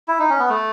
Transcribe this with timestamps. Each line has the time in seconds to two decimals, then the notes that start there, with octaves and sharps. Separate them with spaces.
0.08 E4
0.19 D#4
0.30 C#4
0.39 B3
0.49 A3